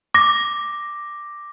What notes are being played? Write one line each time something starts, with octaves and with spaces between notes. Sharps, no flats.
D6 A#6